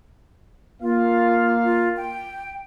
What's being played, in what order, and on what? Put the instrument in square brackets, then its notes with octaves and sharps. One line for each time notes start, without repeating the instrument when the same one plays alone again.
[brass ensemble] A#3 F5 [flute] F4
[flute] F4
G5